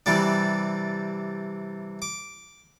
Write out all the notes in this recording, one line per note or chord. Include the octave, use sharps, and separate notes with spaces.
C3 E3 G3 D4
D6